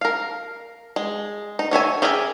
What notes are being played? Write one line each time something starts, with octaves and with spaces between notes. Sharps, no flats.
A#4 F5
G#3
D#4
D#3 C#5 E5 G#5
G4 G#4 A#4 E5 G#5